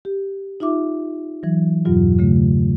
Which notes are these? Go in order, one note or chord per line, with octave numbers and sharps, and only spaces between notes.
G4
D#4 F4 E5 D6
E3 F#3
E2 G2 B2 F#3 F4
C#3 A3